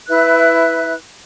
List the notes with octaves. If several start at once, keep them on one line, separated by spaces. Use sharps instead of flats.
E4 B4 E5 F#6